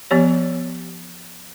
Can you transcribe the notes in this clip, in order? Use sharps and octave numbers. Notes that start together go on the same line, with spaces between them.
F3 B3 G4 C#5